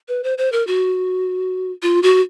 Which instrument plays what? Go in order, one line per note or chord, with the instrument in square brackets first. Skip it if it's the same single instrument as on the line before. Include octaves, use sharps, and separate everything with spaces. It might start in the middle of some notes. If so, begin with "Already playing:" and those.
[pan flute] B4
C5
C5
A#4
F#4
F4
F#4